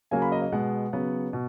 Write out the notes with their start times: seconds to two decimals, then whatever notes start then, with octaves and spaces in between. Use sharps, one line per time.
0.11 C#3 F#3 A#3 G#5
0.22 B5
0.32 D#5
0.42 D#5
0.52 B2 G#3 B3 F#5
0.93 C#3 F#3 B3
1.33 B2